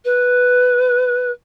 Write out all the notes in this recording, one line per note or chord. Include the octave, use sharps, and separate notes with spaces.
B4